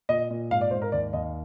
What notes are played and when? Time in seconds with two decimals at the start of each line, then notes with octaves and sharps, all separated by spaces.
0.09 A#2 D#5
0.30 A#2
0.51 G#2 F5
0.61 D5
0.71 G#2 C5
0.82 A#4
0.92 D#2 D5
1.13 D#2 D#5